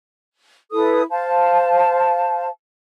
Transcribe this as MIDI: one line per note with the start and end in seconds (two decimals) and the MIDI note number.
0.72 1.02 64
0.72 1.02 69
0.72 1.02 71
0.72 1.02 87
1.10 2.48 72
1.10 2.48 77
1.10 2.48 81